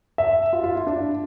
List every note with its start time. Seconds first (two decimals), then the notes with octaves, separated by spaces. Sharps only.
0.18 E5
0.53 F4
0.63 F4
0.75 E4
0.87 D4